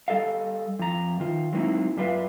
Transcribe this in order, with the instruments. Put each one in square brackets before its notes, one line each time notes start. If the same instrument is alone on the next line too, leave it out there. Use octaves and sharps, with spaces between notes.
[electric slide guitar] G3 G#3 A4 D#5 F5
F2 A#5
D#3 F4
F#3 G#3 A#3 C4 D#4 E4
F#2 G3 F4 B4 E5 F5